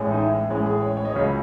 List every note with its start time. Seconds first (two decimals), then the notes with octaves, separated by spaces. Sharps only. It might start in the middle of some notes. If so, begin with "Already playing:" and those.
Already playing: A1 A2 G#3 C#4
0.12 D#4
0.18 E4
0.50 A1 A2 G#3 C#4
0.66 G#4
0.81 C#5
0.97 C#5
1.05 D#5
1.12 C#2 C#3 F#3 C#4 C#5